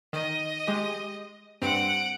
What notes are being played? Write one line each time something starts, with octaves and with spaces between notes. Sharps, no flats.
D#3 D#5
G#3 G4
G2 C4 F#5 D7